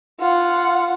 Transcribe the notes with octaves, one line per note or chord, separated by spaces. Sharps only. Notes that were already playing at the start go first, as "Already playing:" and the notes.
F4 F#5